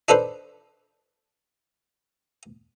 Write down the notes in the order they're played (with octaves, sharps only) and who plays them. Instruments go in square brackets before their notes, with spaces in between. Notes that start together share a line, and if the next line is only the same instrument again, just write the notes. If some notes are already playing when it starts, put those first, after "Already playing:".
[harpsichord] D4 D#4 A4 B4 C5